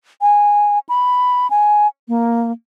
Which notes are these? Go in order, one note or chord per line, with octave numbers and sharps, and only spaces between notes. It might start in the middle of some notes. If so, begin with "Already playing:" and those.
G#5
B5
G#5
A#3